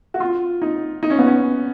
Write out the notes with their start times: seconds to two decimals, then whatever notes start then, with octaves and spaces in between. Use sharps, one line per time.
0.14 F#4
0.20 F4
0.62 D#4
1.03 D#4
1.10 C#4
1.19 B3
1.27 C#4